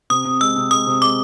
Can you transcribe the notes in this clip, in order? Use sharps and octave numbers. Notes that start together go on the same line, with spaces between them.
C3 D#6
C3
G#3 E6
C3
G#3 D#6
C3
G#3 D6